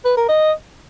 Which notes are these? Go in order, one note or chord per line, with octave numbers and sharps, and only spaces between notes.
B4
A#4
D#5